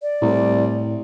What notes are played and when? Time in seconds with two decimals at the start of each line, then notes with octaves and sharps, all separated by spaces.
0.02 D5
0.21 C2 A2